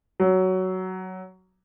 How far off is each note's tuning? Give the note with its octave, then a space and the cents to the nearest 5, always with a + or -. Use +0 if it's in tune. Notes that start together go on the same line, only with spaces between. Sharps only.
F#3 +10